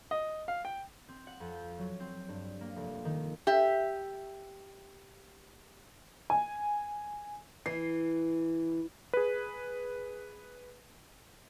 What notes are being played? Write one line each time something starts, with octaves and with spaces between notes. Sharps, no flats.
D#5
F5
G5
C4
F#5
F2
G6
F#3
C4
G2
A#3
F1
D#3
G4 E5
G#5
E3 C7
G#4 B4